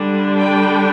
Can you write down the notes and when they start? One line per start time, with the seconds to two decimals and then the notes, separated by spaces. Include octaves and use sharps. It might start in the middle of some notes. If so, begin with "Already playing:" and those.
Already playing: D3 G3 D4
0.39 G5